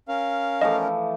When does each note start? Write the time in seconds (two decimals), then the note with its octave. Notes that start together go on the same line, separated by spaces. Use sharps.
0.08 C#4 A#4 F5
0.61 E3 F3 A3 D#5